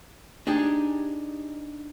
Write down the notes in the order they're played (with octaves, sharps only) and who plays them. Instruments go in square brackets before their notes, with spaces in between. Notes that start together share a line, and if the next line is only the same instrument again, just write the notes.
[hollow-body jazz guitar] D4 D#4 G4 G#4